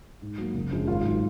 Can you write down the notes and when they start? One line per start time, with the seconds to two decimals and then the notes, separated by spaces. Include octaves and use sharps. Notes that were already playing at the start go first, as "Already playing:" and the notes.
0.22 G#2
0.38 F#3 A#3
0.55 F#1
0.71 F#2 F3 G#3 D4
0.87 G#1 F4 F5
1.04 G#2 F#3